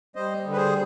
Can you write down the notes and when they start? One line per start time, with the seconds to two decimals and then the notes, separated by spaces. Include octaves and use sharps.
0.15 G3 C5 D#5
0.45 D3
0.52 B4
0.56 G#4 C5